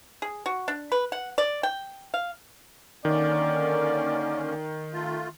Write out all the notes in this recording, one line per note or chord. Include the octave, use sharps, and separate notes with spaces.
G#4
F#4
D4
B4
F#5
D5
G5
F5
D3 D#3 A#3 C#4 D5
A3 F4